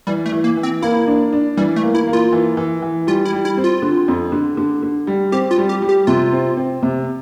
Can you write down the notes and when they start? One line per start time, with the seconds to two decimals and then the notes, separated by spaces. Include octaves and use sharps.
0.07 E3 G3
0.26 A3
0.32 E3
0.44 A#3
0.57 E3
0.63 C4
0.82 A#3 E4
1.07 D4
1.33 D4
1.57 E3 G3
1.76 A3
1.82 A#3
1.95 E4
2.08 A#3
2.13 F4
2.32 E3
2.57 E3
2.82 E3
3.07 G3 F4
3.25 E4
3.32 G3
3.45 E4
3.57 C4
3.64 F4
3.82 D3
4.08 F2
4.32 D3
4.57 D3
4.83 D3
5.07 G3
5.32 C4 G4
5.51 F4
5.58 G3
5.69 G4
5.82 G3
5.89 G4
6.07 C3 F4
6.32 C4
6.57 C4
6.83 C3